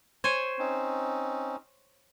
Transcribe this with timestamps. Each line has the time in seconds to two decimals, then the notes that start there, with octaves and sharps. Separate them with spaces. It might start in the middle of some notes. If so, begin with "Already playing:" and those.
0.24 C5 C#5 G#5
0.59 C4 C#4 D#4